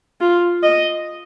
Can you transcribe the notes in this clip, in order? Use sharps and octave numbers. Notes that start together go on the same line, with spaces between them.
F4
D#5